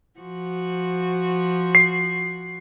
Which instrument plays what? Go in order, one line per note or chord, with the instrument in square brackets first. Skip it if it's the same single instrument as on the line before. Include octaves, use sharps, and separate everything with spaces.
[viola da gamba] F3 F#4
[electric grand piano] C7